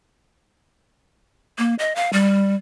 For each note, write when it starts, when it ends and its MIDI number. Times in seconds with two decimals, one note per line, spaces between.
1.58 1.75 58
1.79 1.95 75
1.96 2.11 77
2.13 2.56 55